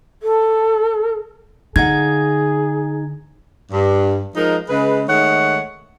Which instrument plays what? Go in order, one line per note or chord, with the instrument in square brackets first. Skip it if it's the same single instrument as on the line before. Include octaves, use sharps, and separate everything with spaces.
[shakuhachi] A4
[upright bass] D3 [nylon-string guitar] D#4 F5 F#5 [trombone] G#4 [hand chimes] G#6
[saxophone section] G2
F3 G#3 D#4 A#4
C#3 G#3 G#4 B4
D#3 G#3 A3 C#5 F#5